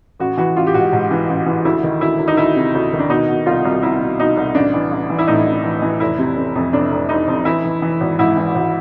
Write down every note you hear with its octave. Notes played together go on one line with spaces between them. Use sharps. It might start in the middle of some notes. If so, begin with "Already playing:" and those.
A1 F#4
E3 F#4
A1 F4
G4
G#2 F#4
G#2
E3
A1
E3
D2 E4
D#3
D2 E4
D2
D#4
D2 E4
C3
D2
D#3
D4
B2 D#4
B2
C2 F4
C2
C2 E4
B2
B2 D#4
C2
A1 D4
E3
A1
E3
E4
A2 D#4
A1
E3
E3
F1 E4
C3
C3
F2
F1 D4
F1
F1 D#4
F2
E3 E4
E3
E3
G#1
G#2 E4
E3
G#1